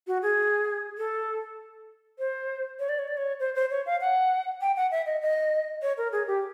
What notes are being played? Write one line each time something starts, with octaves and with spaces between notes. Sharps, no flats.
F#4
G#4
A4
C5
C#5
D5
C#5
D5
C#5
C5
C5
C#5
F5
F#5
G5
F#5
E5
D#5
D#5
C#5
A#4
G#4
G4